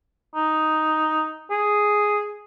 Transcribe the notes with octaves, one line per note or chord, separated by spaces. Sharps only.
D#4
G#4